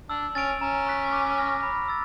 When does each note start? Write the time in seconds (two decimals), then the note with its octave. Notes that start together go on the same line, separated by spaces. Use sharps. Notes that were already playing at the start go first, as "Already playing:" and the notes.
0.09 D4 E6
0.35 C#4 A6 D7 F7
0.61 C#4 A#5
0.86 C#6 F#6 B6
1.12 D6
1.38 F6 A#6
1.63 B5
1.88 E6 A6